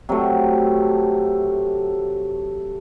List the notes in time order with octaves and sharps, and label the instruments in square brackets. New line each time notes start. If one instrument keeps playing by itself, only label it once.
[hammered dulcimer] C3 F#3 A3